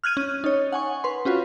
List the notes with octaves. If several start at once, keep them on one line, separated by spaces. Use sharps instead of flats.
F6 F#6 G#6 D#7
C#4
D#4 C#5
F#5 G#5 C#6
B4 C6
C#4 F4 F#4 B4